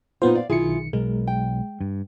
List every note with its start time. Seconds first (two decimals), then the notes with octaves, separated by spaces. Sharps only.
0.22 A#2 B3 D#4 F4 C5
0.35 D5 F5
0.50 B1 D#3 E4 F4 G#4 C#7
0.93 B1 G#3 A#4
1.28 G5
1.81 G2